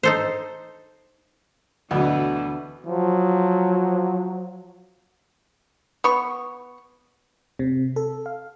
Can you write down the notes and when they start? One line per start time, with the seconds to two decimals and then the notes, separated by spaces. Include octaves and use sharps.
0.03 D#4 A4 C5
1.91 D2 B2 D3 E3 B3
2.86 F3 F#3
6.04 B3 C#6
7.59 C3
7.96 A4
8.26 F5